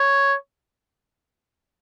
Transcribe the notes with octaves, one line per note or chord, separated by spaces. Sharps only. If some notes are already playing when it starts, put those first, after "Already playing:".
Already playing: C#5